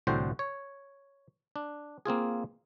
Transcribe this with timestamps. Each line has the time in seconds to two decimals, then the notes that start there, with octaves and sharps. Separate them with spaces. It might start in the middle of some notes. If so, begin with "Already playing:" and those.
0.07 C2 A2 D3 F#4 C5 G5
0.39 C#5
1.56 D4
2.05 A#3 C4 F4 G#4